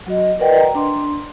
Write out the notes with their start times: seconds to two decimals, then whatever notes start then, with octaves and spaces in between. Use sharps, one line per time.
0.07 F#3 F#4 D#5
0.39 A#4 B4 D5 D#5 F#5 G5
0.59 A#5
0.75 D4 C6